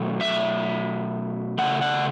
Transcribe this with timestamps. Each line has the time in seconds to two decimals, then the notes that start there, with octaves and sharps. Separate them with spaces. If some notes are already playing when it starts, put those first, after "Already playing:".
Already playing: B2 F#3 A3
0.21 E5
1.58 C#3 E3 A3 F#5
1.81 F#5